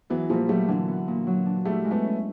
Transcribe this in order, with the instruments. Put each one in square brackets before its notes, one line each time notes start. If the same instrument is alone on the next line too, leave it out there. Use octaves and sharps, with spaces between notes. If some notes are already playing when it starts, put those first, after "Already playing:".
[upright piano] E3 F#3 [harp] B3
[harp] A#2 [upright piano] F3 G3
[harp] F#3 [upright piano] G3 A3
[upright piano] D3 E3 [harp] D4
[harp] B3
A#2
F#3
D4
[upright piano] G3 A3 [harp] E4
[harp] G#3
[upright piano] A3 B3
[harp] C#4